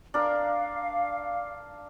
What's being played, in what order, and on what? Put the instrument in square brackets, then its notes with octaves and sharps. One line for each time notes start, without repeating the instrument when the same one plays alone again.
[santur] D4 A#4 [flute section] F5